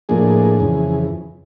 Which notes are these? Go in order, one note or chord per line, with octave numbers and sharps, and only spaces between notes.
A2 F3 A#3 D4 G#4
F2 C#3 E3